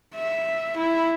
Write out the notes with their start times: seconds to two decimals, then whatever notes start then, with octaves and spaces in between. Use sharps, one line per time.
0.15 E5
0.77 E4